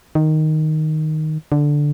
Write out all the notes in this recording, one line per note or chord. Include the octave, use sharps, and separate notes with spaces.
D#3
D3